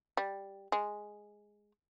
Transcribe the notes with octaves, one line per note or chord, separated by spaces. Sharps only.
G3
G#3